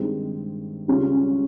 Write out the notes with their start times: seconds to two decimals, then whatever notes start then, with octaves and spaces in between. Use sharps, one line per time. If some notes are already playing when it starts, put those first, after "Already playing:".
Already playing: G2 D#3 G#3 C4
0.88 C#2 C#3 G3 C#4 F4